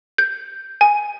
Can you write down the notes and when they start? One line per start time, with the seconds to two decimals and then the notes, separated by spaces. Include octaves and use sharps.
0.18 G6
0.81 G#5